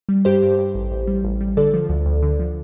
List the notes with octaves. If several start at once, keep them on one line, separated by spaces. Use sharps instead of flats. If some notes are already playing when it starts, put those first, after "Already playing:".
G3
G2 G4 C5
G2
G2
A1
A1
G3
A1
G3
D3 A4 D5
F3
D2
D2
D3
F3